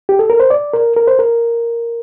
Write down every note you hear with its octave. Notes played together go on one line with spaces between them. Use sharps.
G4
A4
A#4
C5
D5
A#4
A#4
C5
A#4